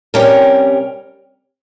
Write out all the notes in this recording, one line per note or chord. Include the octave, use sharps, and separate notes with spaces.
C3 G3 C#4 G4 A#4